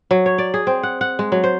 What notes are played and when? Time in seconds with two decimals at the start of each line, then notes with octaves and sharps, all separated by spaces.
0.11 F#3
0.26 C#5
0.38 D5
0.54 G#4
0.67 C4
0.83 F#5
1.01 F#5
1.19 G#3
1.32 F#3
1.44 C5